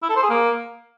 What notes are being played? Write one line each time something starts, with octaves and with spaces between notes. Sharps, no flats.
E4
A4
C5
G#4
A#3